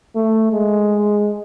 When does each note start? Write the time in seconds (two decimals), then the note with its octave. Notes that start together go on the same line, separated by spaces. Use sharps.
0.15 A3
0.52 G#3